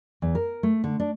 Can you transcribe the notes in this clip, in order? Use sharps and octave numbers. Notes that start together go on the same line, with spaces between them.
E2
A#4
A3
D3
D4